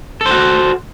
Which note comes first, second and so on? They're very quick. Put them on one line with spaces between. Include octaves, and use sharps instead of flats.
A4 C5 F#4